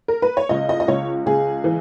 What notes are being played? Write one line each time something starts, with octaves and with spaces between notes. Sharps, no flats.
A#4
B4
C#5
C#2 D#5
D#5
D#5
C#2 C#5
C#2 G#4
E3